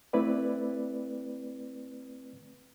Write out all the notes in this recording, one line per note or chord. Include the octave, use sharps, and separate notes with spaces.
A3 C4 E4 B4 D5